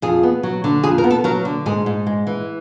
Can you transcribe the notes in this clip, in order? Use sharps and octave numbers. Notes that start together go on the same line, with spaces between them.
F2 G#4
B3
F#3
D3
F2 G#4
A#4
B3
A4
F#3 A#4
D3
G#2 G#4
G#2
G#3
E3